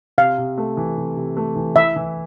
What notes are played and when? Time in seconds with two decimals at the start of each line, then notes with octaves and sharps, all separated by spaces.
0.18 C3 F5
0.38 C3
0.57 A3
0.77 E3
0.97 C3
1.16 C3
1.37 A3
1.55 E3
1.76 E4 E5
1.96 E3